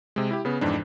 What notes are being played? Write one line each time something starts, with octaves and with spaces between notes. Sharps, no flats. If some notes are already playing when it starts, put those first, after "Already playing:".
C3 G#3
E4 G4
C#3 B3
F2 G#2 E3 D4